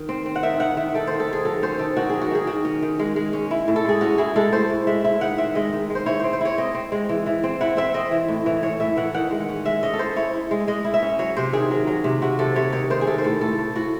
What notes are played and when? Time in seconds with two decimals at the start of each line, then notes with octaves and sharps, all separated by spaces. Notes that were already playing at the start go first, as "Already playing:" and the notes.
Already playing: D#3
0.09 C4
0.26 C4
0.36 F#5
0.43 D#3 E5
0.60 D#3 F#5
0.77 D#3 E5
0.94 D#3 A4
1.07 D#3 C5
1.20 A4
1.28 D#3 G#4
1.45 F#3 A4
1.62 C#4 C5
1.79 D#3 A4
1.97 D#3 F#4
2.09 F#3 G#4
2.21 F#4
2.31 D#3 G#4
2.47 D#3 F#4
2.65 C#4
2.82 D#3
2.99 G#3
3.16 G#3
3.33 C#4
3.51 E4
3.68 A2
3.76 A4
3.85 G#3 G#4
4.01 C#4 F#4
4.18 E4 G#4
4.36 G#3 A4
4.53 A2 C5
4.70 A2
4.87 G#3 E5
5.04 E4 E5
5.21 D#3 F#5
5.38 C4 E5
5.55 G#3 D#5
5.72 D#3
5.90 G#3
5.95 C5
6.06 E4 C#5
6.20 C4 C5
6.33 C5
6.41 E4 C#5
6.58 C4 D#5
6.74 C4
6.92 G#3
7.09 E3
7.26 E3
7.44 C4
7.61 E4 F#5
7.77 C4 E5
7.94 C4 D#5
8.11 E3
8.28 A2
8.46 E3
8.63 A2 C#5
8.80 A2 E5
8.97 E3 F#5
9.14 D#3 F#5
9.31 G#3
9.40 F#5
9.49 C#4
9.65 G#3 E5
9.83 C#4 D#5
9.93 A4
9.99 E4 C5
10.16 E4 C#5
10.33 E4
10.51 G#3
10.67 G#3 D#5
10.85 E4
10.94 E5
11.02 C#4
11.19 F#3 C#5
11.37 C3 C5
11.53 D#3 G#4
11.71 F#3
11.87 F#3
12.04 C3
12.22 C3 F#4
12.39 C3 A4
12.56 C3 C#5
12.72 D#3 C#5
12.90 D#3 C5
13.01 G#4
13.07 C3 A4
13.18 C5
13.24 A2 A4
13.41 A2 A4
13.58 A2
13.76 A2 F#4